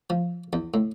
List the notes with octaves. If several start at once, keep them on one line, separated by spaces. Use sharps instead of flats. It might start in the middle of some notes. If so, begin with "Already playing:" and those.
F3
E2
A2